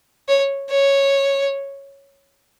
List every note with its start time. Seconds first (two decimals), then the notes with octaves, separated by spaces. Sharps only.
0.28 C#5
0.70 C#5